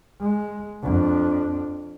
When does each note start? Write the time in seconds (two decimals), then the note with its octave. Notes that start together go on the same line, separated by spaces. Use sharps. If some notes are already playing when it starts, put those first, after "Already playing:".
0.20 G#3
0.83 F2 D4